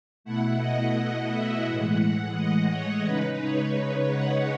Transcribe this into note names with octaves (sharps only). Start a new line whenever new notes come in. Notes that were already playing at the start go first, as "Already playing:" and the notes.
B2 A3 E4 F#5
D#5
E5
A2 E3 G#3 F#5
F#5
D#5
C#5
C#3 G#3 D#4 B4
C#5
B4
F#5